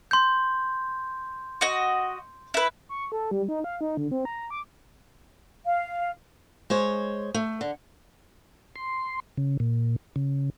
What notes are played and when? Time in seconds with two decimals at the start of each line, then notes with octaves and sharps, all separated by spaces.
0.11 C6 G6
1.61 F#4 D#5
2.54 E4 B4
2.89 C#6
3.12 A4
3.31 G3
3.49 D#4
3.64 F5
3.81 D#4
3.97 D3
4.11 C4
4.25 A#5
4.50 D6
5.65 F5
6.70 G#3 C5 C#5
7.34 A3
7.61 D3
8.76 C6
9.37 C#3
9.60 A#2
10.16 C#3